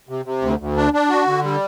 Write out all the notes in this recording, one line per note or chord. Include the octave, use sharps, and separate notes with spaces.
C3
C3
D2
D2
D4
D4
F#4
D3
G3